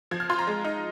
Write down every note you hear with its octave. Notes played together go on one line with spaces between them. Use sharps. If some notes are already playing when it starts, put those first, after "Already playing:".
F3 G#6
F6
F4 C6
A#5
G#3
D#4